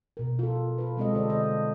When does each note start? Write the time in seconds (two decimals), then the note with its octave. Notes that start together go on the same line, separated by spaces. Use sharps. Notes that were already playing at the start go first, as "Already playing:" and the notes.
0.17 B2 A#4
0.39 F4 A4
0.78 F4 B4
0.97 G3 G#3 C4 F4 A4 D#5
1.14 D3 A4 C5 D5
1.30 D#5